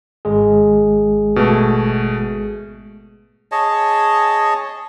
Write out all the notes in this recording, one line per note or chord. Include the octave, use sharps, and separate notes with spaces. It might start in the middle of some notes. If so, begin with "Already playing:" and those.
G#1 G#3 G#4
B2 A3
G#4 C#5 D#5 A5